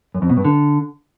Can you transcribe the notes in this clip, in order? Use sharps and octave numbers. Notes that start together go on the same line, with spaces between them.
F#2
F2
B2
G2
D3